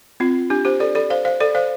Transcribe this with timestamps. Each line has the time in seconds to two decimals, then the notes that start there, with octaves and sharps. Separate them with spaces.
0.20 C4 F4
0.50 D4 G4
0.65 G4 C5
0.80 A4 D5
0.95 A4 D5
1.10 C5 F5
1.25 C5 F5
1.40 A4 D5
1.55 C5 F5